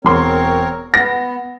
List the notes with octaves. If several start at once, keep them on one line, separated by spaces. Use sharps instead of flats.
E1 C4 A#4 C#5 C6
B3 A#6